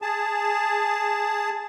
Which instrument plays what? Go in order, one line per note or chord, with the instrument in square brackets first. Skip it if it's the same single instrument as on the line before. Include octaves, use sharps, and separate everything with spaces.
[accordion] G#4 A5